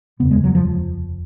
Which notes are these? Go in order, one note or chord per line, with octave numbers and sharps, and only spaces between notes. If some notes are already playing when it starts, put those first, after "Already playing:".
F1 D#2 C#3 B3
G#3
F#3
F3